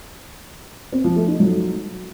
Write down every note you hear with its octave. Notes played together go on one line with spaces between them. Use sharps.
C4
F3
A3
D#4
F#3